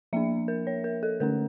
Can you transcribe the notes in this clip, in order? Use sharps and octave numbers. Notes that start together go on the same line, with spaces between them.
F3 A#3 D4 E5
A#4
C#5
A#4
A4
D3 A3 C#4 A#4